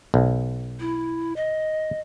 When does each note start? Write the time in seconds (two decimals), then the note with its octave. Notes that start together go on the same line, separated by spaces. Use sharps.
0.14 B1
0.80 E4
1.36 D#5